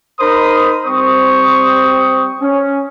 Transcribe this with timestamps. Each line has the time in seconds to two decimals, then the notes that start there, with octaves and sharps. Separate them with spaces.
0.19 D#4 A#4 C5 B5 C6 D#6
0.84 G3 C4 C5 C#6 D#6
2.41 C#4